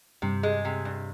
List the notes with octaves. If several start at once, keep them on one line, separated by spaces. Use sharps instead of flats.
G2 C3
G#3
C3
G2